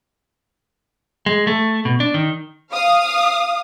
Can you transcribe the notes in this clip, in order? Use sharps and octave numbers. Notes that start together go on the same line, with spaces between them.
G#3
A3
B2
D4
D#3
F5 D#6